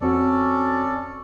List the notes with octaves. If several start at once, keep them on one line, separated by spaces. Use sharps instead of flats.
F2 C4 C#4 F#4 A4 D5